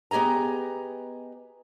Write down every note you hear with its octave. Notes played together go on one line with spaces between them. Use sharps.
B3 G4 G#4 D#5 A#5